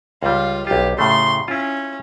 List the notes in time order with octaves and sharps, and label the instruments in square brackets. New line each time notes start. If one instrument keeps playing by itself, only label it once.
[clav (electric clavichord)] C#2 G3 [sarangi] F4
[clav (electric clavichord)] B1 F4 [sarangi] G4
[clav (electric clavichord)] A2 C#3 A3 [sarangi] C6
[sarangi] C#4 [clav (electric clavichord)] E4 F4